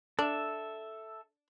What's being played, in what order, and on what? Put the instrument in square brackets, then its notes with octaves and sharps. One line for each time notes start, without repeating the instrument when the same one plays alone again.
[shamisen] D4 [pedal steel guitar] A4 E5